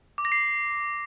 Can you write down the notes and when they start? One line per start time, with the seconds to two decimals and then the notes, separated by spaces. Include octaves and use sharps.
0.18 D6
0.25 A#6
0.32 C7